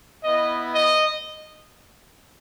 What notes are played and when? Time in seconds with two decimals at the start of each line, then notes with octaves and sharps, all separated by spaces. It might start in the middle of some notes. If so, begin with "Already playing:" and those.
0.24 B3 E4 D#5
0.73 D#5